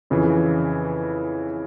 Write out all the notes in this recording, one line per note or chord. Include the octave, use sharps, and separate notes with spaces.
F2 C#3 E3